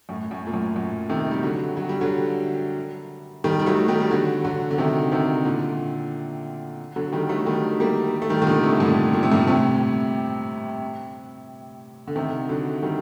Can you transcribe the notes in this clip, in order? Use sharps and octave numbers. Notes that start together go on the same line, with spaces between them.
F#2 A2
F#2 A2
A#2
F#2 A2
F#2
C3 D#3
G3
D3 F#3
F#3
G3
D3 F#3
D#3 G3
G3
F#3 A3
D#3 G3
G3
D3 F#3
D3 F#3
D3
C3 D#3
C3 D#3
A#2 D3
D3 F#3
D#3 G3
F#3 A3
D#3 G3
G3 A#3
A3
D#3 G3
D#3
A#2 D3
A2 C3
G2 A#2
A#2
C3
G2 A#2
A2 C3
D3
C3 D#3
D3 F#3
D#3 G3